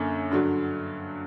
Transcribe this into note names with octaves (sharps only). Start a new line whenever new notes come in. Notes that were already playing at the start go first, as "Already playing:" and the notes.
Already playing: F#2 D3 A#3 C#4
G2 D3 F#3